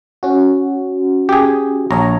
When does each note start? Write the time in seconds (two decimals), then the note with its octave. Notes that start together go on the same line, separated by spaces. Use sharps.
0.23 C#4 F#4
1.29 G4 G#4
1.91 A#1 C#5 A#5